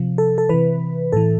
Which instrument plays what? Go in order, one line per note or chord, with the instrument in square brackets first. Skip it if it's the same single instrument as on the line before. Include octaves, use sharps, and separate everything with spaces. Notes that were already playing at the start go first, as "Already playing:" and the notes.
Already playing: [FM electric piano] C3 F3
A4
A4
C3 E3 B4
A2 E3 A4